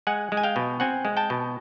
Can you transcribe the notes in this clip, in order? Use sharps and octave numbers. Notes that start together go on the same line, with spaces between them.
G#3 F#5 G#5
G#3
G#5
F5 G5
B2
C4 F#5 G#5
G#3
G5 A5
B2